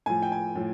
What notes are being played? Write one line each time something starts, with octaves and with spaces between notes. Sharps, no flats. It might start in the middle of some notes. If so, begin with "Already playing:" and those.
A2 F3 G#5
G5
G#5
A2 F3